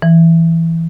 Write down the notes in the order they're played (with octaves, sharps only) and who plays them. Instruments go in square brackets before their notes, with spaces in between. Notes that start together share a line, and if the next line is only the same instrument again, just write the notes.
[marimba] E3